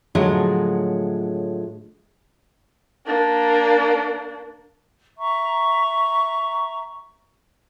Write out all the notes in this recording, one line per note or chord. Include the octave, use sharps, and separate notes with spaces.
A2 D3 F3 F#3 G#3
A#3 D4
E5 A#5 C#6